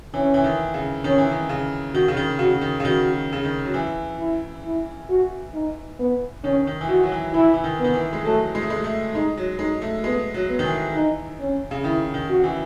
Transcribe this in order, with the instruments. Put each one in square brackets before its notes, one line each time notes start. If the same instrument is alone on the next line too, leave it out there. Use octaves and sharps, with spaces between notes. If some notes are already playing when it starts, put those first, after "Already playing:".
[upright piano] E3 [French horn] C#4
[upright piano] E3
D#3
C#3
[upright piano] D#3 [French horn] C#4
[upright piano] E3
D#3
C#3
[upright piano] D#3 [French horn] F#4
[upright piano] C#3
D#3
[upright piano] C#3 [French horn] F#4
[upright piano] D#3
C#3
[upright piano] D#3 [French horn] F#4
[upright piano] C#3
D#3
F#3
E3
[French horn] E4
E4
F#4
D#4
B3
[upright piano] D#3 [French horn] C#4
[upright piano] D#3
E3
[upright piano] D#3 [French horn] F#4
[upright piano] F#3
E3
[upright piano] E3 [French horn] E4
[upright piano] E3
D#3
[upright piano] D#3 [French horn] B3
[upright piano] E3
G#3
[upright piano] F#3 [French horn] A3
[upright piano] G#3
A3
G#3
A3
[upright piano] G#3 [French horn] D#4
[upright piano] F#3
[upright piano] G#3 [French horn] D#4
[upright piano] A3
[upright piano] G#3 [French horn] B3
[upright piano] F#3
[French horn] B3
[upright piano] D#3
E3
[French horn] D#4
C#4
[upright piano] C#3
[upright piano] D#3 [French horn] E4
[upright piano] D#3
[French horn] F#4
[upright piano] E3